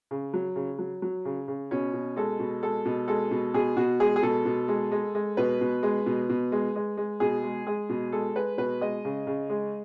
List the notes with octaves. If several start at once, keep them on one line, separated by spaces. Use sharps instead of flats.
C#3
F#3
C#3
F#3
F#3
C#3
C#3
B2 C#4
B2
G#3 A4
B2
G#3 A4
B2
G#3 A4
B2
B2 G#4
B2 F#4
G#3 G#4
G#4
B2 A4
B2
G#3
G#3
G#3
B2 B4
B2
G#3
B2
B2
G#3
G#3
G#3
B2 G#4
G#3
G#3 G#4
B2
G#3 A4
G#3 B4
B2 B4
G#3 D#5
C#3
C#3
G#3